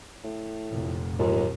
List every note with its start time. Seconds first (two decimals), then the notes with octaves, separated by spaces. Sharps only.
0.24 A2
0.71 F1 A#2
1.19 D#2 G#2 F3 F#3